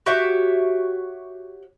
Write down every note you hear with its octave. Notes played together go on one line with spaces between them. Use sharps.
F#4 G4 C#5 E5